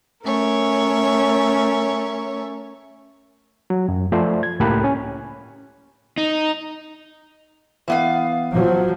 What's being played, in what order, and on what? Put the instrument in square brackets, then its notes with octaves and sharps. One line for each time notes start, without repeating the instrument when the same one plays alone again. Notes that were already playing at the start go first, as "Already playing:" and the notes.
[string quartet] A3 C#4 A#4 C#5 E5
[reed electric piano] F#3
F#2
F3 A3 C5 D5 E5
G#6
C#2 A2 A#3 G4 B5 F#6
C#4
[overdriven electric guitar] D#4
[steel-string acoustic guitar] E3 B3 F5
[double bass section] F3 F#3